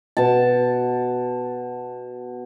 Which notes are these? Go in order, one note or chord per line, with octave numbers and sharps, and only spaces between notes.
B2 A5